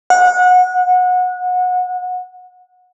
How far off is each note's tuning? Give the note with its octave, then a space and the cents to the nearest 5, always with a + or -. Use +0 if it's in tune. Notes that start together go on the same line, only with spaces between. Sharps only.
F#5 -25